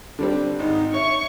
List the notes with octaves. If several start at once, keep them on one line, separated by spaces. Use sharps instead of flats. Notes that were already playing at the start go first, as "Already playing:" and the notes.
D3 G3 C4
G#1 D#4
C#5 E5 C#6